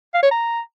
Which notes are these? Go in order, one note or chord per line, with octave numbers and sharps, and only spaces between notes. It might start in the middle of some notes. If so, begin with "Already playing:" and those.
F5
C#5
A#5